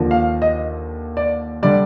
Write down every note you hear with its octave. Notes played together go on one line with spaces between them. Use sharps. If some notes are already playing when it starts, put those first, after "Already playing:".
Already playing: D#2 D3 F3
F5
D#5
D5
D3 G3 D5